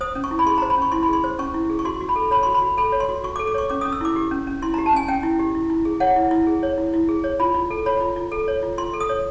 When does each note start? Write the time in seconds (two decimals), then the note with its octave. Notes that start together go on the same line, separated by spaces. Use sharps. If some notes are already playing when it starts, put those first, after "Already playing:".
0.01 C5 D#6
0.15 C#4
0.24 C#6
0.31 E4
0.39 B5
0.46 G#4 C6
0.58 A#5
0.62 C5
0.70 B5
0.78 C#4 C#6
0.92 E4 C6
1.03 B5
1.09 G#4 C6
1.24 C5
1.39 C#4 C#6
1.54 E4
1.70 G#4
1.79 C#6
1.85 F#4 C6
2.01 F#4
2.09 B5
2.16 A4
2.31 C#5 B5
2.43 C6
2.47 F#4
2.54 B5
2.62 F#4
2.77 A4 B5
2.92 C#5
3.00 C6
3.09 F#4
3.24 F#4 C#6
3.36 D6
3.39 A4
3.47 D6
3.54 C#5 C#6
3.70 C#4 D6
3.81 D#6
3.85 C#4
3.92 E6
4.01 E4 D6
4.16 G4
4.31 C#4
4.47 C#4
4.62 E4 C6
4.74 A#5
4.78 G4
4.86 A5
4.93 C#4 G#5
5.08 C#4 G5
5.23 E4
5.39 G4
5.55 E4
5.70 E4
5.85 G#4
6.00 C#5 F#5
6.16 E4
6.31 E4
6.47 G#4
6.63 C#5
6.78 E4
6.94 E4
7.09 G#4
7.24 C#5
7.40 F4 B5
7.54 F4
7.70 A4
7.86 C#5 B5
8.01 F4
8.16 F4
8.32 A4
8.48 C#5
8.63 F4
8.78 F4 C6
8.93 A4
9.00 D#6
9.09 C#5